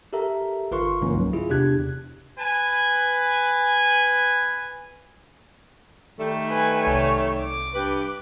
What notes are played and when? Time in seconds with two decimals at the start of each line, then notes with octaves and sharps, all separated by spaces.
0.13 G4 A4 A#4 E5 A#5
0.71 G1 F4 A#4 B4 C6 C#6
1.02 G#2 D3 F3 A#3 C#4
1.14 C#2 F#3
1.33 E4 F4 G#4
1.50 E2 C3 D4 G4 F#6 G#6
2.39 B4 G#5
6.19 D#3 G3 A3
6.49 B4 G#5
6.87 C2 C#5
7.42 D6
7.74 G2 G4 B4